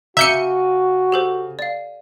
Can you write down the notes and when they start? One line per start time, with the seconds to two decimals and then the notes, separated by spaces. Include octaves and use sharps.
0.17 C#3 F#4 E5 A#5 D6 G6 C#7 D#7
1.12 G4 A4 C5
1.59 D5 F5